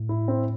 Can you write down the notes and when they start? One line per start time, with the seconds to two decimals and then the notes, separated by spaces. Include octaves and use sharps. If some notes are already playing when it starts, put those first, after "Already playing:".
Already playing: A2
0.09 E4
0.28 C4